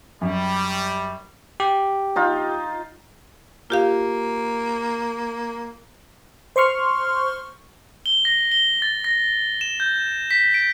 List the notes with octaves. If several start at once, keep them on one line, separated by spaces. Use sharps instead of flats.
F#2 G3
G4
D#4 F4
A#3 F4 G4 F5
C5 C6 C#6 F6
G7
A#6
G7
A6
A#6
E7
G6
B6
D7